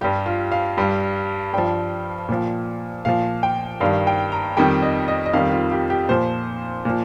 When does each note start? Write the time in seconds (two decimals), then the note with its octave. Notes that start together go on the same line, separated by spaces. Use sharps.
0.01 G2 G3 G4
0.26 F4
0.52 F5
0.77 G2 G3
1.53 G2 F3 G5
2.29 A#2 F3
3.05 A#2 F3 F5
3.43 G5
3.80 G2 D#3 G3 F5
4.07 G5
4.32 A#5
4.57 F2 D#3 G3 G5
4.82 D#5
5.08 D#5
5.26 D#5
5.33 F2 D#3 G3 F5
5.52 F4
5.71 G4
5.90 G4
6.09 A#2 F3 C5
6.85 A#2 F3